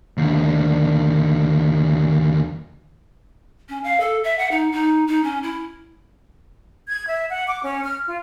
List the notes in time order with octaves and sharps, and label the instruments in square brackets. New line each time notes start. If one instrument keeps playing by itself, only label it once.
[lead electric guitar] D#2 D3
[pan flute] C#4
F5
A4
E5
F#5
D#4
D#4
D#4
C#4
E4
[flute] G#6
E5
F#5
D6
C#4
F6
F4